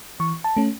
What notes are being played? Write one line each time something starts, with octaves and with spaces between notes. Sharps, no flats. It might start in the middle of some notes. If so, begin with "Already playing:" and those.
E3 C#6
A5
A3 C#4